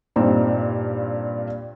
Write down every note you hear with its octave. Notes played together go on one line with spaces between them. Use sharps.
G2 A#2 C4 D#4